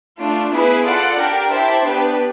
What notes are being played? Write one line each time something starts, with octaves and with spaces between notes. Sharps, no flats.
A3 D4 F4
B3 E4 G#4 B4
F4 A4 D5 F#5
D4 G4 A#4
E4 G4 C5 E5 A5
B3 D4 G4 B4